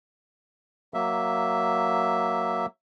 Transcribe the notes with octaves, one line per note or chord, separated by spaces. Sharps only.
F#3 A#3 E5